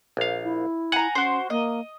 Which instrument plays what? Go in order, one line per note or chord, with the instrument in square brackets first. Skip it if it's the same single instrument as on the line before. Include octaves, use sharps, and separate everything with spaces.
[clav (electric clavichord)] A#1 F5
[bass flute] E4
[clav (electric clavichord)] F#5 [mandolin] G#5 A#5
[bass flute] C#4 [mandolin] F#4 C5
[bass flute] A#3 [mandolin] D#5